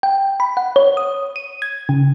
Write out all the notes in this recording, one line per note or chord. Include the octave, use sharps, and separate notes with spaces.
G5
B5
F#5
C#5
D#6
D#7
G#6
C#3